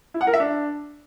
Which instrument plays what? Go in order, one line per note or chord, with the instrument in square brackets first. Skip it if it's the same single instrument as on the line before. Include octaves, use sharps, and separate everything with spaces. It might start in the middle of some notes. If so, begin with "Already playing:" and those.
[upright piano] E4
F#5
A#4
E5
D4